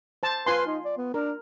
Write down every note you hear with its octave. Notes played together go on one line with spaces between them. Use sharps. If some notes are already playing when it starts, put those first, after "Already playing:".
C5 A5
F4 B4 G#5 C6
D#4
D5
B3
D4 A#4